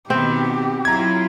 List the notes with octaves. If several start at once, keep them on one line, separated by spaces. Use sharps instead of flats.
B2 D#3 B3 C4 G4
F#3 E4 F4 A#5 G#6